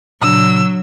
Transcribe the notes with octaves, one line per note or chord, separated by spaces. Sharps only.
A#2 C#3 F#3 D4 E6